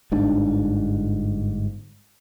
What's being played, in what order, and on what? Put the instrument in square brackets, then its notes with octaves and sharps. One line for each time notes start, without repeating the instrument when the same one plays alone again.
[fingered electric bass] G1 G#2 D4